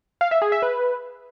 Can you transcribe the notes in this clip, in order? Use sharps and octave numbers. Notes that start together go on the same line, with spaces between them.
F5
E5
G#4
E5
B4